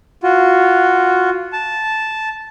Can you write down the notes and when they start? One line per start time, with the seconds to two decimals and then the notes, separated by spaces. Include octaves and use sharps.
0.23 F4 F#4
1.53 A5